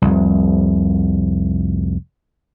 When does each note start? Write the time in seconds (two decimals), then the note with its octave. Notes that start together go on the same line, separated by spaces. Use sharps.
0.02 F1 C2